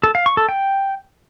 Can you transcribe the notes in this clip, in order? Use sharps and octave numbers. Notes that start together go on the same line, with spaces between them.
A4
F5
C#6
A4
G5